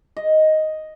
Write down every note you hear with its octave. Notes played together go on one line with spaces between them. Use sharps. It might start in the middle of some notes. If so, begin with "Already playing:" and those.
D#5